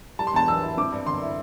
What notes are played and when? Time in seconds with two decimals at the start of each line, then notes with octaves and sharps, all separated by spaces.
0.19 G3 A5
0.27 C6
0.34 E2 A5
0.48 E3 E6
0.63 E4
0.77 C4 D6
0.92 G2
1.07 D3 C6
1.22 E4